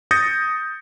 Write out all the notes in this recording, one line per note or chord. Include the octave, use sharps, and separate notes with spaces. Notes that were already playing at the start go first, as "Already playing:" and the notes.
D#6 G6 A6 A#6 C#7